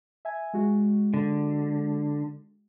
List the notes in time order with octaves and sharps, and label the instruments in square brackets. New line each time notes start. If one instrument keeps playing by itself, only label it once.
[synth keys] E5 G#5
G#3 F#4
[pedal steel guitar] D3